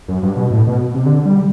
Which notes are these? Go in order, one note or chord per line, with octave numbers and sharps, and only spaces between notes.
F#2
G2
B2
A2
B2
C3
D3
G3